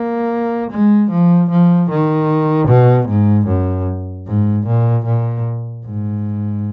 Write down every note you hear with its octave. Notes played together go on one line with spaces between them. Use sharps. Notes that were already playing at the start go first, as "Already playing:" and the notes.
Already playing: A#3
G#3
F3
F3
D#3
B2
G#2
F#2
G#2
A#2
A#2
G#2